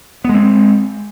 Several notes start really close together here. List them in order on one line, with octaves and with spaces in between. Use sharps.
B3 G#3 C4